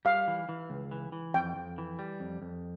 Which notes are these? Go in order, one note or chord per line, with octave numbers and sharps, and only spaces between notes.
G3 F5
E3
E3
C#2
E3
E3
F2 G5
F2
E3
G3
F2
F2